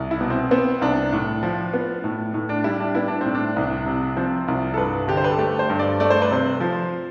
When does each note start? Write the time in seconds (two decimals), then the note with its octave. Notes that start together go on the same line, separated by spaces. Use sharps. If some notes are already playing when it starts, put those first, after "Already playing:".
Already playing: C2
0.11 E4
0.21 B2
0.30 C4
0.51 B3 C4
0.81 C2 D4
1.13 A2
1.43 F3
1.73 B3
2.04 A2
2.34 A2
2.49 D4
2.64 G3 E4
2.80 D4
2.95 B3 E4
3.08 D4
3.21 A2 C4
3.35 D4
3.56 C2
3.86 C3
4.16 F3 C4
4.48 C2
4.74 A4
4.78 G2 B4
5.08 D3 G4
5.17 C5
5.24 B4
5.32 A4
5.39 A3 G4
5.59 C5
5.70 G2
5.79 D5
6.00 A3 D5
6.10 C5
6.22 B4
6.31 C3 C5
6.60 F3